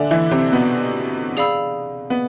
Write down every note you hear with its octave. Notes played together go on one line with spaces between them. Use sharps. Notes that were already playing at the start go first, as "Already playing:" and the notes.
Already playing: D3 D4 A4 E5 G#5
E3 E4
C3 C4
B2 B3
G#4 D5 F5 B5 E6
B3